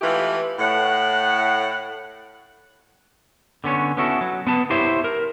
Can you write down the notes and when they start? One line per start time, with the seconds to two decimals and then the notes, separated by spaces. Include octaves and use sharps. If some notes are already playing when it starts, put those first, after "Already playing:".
0.02 E3 G#3 A3 F4 G4 B4
0.59 A2 F#5
3.64 D3 B3 C#4 C#5
3.97 B3 C#4 E4 F#4 A4
4.21 F#3
4.47 B3 B4 A5
4.70 E4 G4 C5 C#5 E5
5.04 A#4